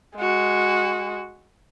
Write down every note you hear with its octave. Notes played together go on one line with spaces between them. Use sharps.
G#3 F#4